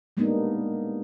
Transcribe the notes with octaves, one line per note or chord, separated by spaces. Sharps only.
G3 G#3 A#3 B3 D4 D#4